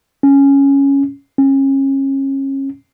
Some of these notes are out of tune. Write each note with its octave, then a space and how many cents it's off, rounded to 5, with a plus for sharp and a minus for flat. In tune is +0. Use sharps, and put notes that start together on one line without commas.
C#4 +0
C#4 -30